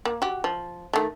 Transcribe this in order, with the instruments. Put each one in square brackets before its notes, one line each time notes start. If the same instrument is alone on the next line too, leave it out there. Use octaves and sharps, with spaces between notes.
[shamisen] A#3
F#4 G4
F3
D#3 A3